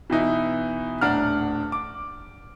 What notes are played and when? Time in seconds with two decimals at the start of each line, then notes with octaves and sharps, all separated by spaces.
0.10 B2 E3 D#4 E4
1.01 D#1 A2 D4 F#5 A#5 F6
1.72 D6